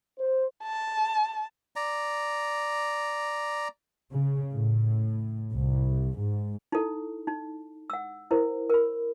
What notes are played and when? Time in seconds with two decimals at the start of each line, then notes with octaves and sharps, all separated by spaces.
0.19 C5
0.64 A5
1.76 D5 A#5
4.12 C#3
4.54 A2
5.55 C2
6.19 G#2
6.72 D#4 E4 A4
7.27 D#4
7.90 F#5 E6
8.31 E4 A#4 C5
8.70 A#4 B5